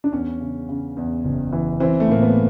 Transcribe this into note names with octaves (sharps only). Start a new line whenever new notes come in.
D4
E2 C#4
C#3
C#3
E2
F#1
E3
E3 C4
A3
A2 A#3
B3